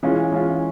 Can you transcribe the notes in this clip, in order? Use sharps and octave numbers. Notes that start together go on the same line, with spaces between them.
E3 G#3 C#4 F4
E3 G#3 C#4 F4